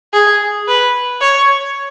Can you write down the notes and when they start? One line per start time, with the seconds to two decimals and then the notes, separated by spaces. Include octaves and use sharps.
0.13 G#4
0.68 B4
1.21 C#5